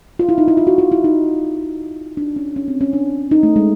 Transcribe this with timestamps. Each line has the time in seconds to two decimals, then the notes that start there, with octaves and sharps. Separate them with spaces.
0.19 F4
0.29 E4
0.38 D#4
0.48 E4
0.57 F4
0.67 F#4
0.78 F4
0.92 E4
1.04 D#4
2.17 D4
2.36 C#4
2.56 C#4
2.68 C4
2.81 C#4
2.93 D4
3.31 D#4
3.43 A3
3.56 G#3